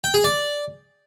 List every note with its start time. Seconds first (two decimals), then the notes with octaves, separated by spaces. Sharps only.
0.04 G5
0.14 G#4
0.24 D5